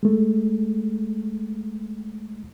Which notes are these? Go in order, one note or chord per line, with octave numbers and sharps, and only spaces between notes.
G#3 A3